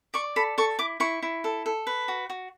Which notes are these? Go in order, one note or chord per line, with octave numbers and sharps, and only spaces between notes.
D5 C#6
A4 B5
A4 C#6
E4 D6
E4 C#6
E4
A4
A4
B4
F#4
F#4